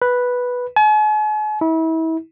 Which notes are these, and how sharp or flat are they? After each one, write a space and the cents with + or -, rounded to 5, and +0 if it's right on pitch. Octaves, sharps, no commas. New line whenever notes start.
B4 -5
G#5 +45
E4 -35